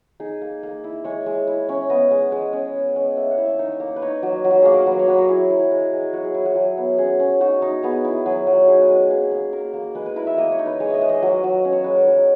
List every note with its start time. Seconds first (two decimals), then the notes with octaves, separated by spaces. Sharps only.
0.20 D#4 G#4
0.41 A#3
0.63 A#3
0.84 E4
1.04 G#3 C#5
1.26 G#3
1.47 E4
1.69 C#4
1.90 B3 D#5
2.11 G#3
2.32 G#3
2.53 C#4
2.74 C#4
2.96 C#4
3.17 A#3 E5
3.31 F#5
3.38 E4
3.45 E5
3.59 D#4 C#5
3.80 A#3
3.96 B4
4.02 D#4 C#5
4.23 F#3
4.44 F#3
4.51 F#4
4.62 A#3 G#4
4.74 A#4
4.86 F#3 B4
4.99 C#5
5.07 F#3 B4
5.18 A#4
5.28 E4 G#4
5.50 E4
5.71 G#3
5.93 G#3
6.13 F#3 F#4
6.24 G#4
6.34 E4 G#4
6.45 F#4
6.55 F#3 G#4
6.78 B3
6.98 C#4 G#4
7.20 C#4
7.40 D#4 F#4
7.62 D#4
7.83 B3 G#4
8.05 E4
8.26 F#3 G#4
8.47 F#3
8.68 D#4 G#4
8.82 B4
8.89 G#3
8.97 G#4
9.10 A#3 G#4
9.31 A#3
9.53 A#3 A#4
9.74 A#3
9.95 G#3 B4
10.06 B4
10.16 E4 A#4
10.27 E5
10.38 A#3 D#5
10.52 C#5
10.59 D#4
10.66 B4
10.80 G#3 C#5
10.90 D#5 E5
11.01 G#3
11.09 D#5
11.22 F#3
11.43 F#3
11.65 C#4
11.72 C#5
11.84 G#3 B4
11.96 A#4
12.07 F#3 G#4